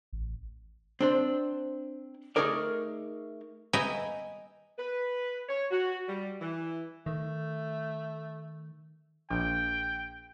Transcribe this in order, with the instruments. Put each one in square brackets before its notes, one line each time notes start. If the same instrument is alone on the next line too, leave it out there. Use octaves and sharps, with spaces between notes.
[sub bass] A1
[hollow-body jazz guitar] C4 D4 C5
A3 C#4 D#4 G#4 A#4 D5
[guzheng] D#5 E5 G5 G#5 A#5 B5
[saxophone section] B4
C#5
F#4
G3
E3
[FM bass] D#3 [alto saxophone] A3
[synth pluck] A#1 [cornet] G5